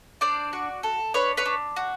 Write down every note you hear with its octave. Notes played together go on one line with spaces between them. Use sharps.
D4 C5 D5
F#4
A4
D4 B4 C#5
B4 C#5
D4
F#4